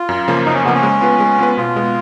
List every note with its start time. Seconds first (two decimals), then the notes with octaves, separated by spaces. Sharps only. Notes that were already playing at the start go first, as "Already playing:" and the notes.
Already playing: F4
0.09 F#2
0.28 C#3 F3 A#3
0.46 F#2 D#4
0.55 C#4
0.65 C#3 F3 A#3 B3
0.74 C#4
0.83 G#3
1.01 B3 F4 B4
1.20 G#3
1.39 B3 F4 B4
1.57 B2 F4
1.76 G#3 B3